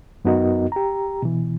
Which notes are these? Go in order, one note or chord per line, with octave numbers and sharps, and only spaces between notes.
F#2 B3 D#4 F#4 A#4 D#5
G4 A#5
B2 E3